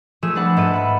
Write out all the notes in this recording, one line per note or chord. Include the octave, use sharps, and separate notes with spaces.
F3 A3 G#4 E6
A3 D4 B4 F#5
G#2 A4 E5 A5 D#7
F#5 B5